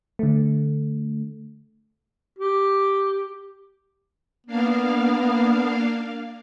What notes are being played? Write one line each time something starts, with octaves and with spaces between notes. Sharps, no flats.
D3 A3
G4
A#3 B3 D4 F5